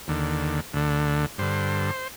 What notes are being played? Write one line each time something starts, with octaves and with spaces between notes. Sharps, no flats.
D#2 D3
D2 D3
G2 D3 C5